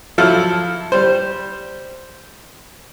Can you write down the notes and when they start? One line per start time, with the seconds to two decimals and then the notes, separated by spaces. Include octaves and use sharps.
0.18 F3 F#3 E4 A4 F5
0.92 G3 C5